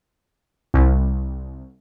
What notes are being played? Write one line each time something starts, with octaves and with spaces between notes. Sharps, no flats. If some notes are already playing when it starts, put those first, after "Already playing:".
C2